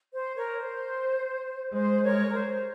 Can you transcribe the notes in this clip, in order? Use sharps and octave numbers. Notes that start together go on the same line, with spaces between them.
C5
A#4 C#5
C5
G#3 C5
A#4 C#5
A#4
C5